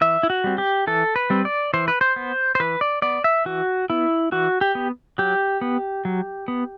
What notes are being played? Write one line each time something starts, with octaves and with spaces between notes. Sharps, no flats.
E3 E5
E4
F#4
G3 C4
G4
E3 A4
B4
G3 C4
D5
E3 C5
B4
C5
B3
C5
E3 B4
D5
B3 D5
E5
E3 F#4
B3 E4
E3 F#4
G4
B3
F#3 G4
B3
F#3
B3